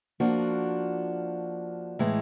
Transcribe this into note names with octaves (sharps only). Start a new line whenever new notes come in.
F3 A#3 D4 F#4
A2 E3 G#3